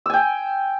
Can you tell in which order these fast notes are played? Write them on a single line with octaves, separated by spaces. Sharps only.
E6 G#5 G5